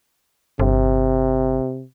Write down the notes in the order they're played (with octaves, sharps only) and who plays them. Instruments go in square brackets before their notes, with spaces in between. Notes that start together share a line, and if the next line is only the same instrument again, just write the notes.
[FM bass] G1 [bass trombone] C3